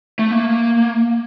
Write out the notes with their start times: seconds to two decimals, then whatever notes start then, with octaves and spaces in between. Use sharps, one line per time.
0.19 A3
0.31 A#3